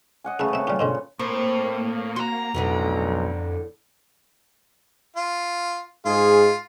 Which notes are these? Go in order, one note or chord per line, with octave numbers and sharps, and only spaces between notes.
D#5 F#5 G#5
C#3 A3 G#4 B4 E5
C4 E5
A#2 G3 G4
G#2 B2 D3 C5
A2 A#3 C4
F#4 A#5 C6
B1 F2 A2 D3 B3
F4
G#2 G#3 F4 G#4